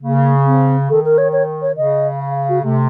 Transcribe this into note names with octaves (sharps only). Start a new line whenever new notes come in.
C#3 A#3
C4
D#3 A4
A#4
C#5
C#5
C#5
C#3 D#5
F5
F5
F#4
C3 A3